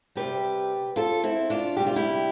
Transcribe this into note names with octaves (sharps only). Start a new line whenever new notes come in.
C3 G3 G4 B4
F4 A4
C4 E4
D4 F4
C3 G3 G4
F4
E4 G4